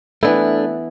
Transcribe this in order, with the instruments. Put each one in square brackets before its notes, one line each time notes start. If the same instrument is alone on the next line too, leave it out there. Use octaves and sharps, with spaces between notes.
[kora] E3 B3 E4 [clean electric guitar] A3 D4